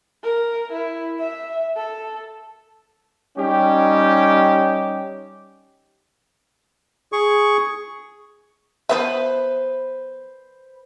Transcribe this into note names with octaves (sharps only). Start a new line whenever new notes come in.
A#4
E4
E5
A4
G3 C#4 D#4 G4
G#4 C#6
F3 B3 B4 C5 E5